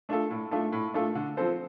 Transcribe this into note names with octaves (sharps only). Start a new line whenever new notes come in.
A3 D4 F4 A4
A2
A3 D4 F4 A4
A2
A3 D4 F4 A4
D3
F3 C4 A4 C5